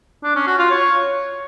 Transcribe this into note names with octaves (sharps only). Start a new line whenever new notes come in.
D4
C#4
F#4
F4
C#5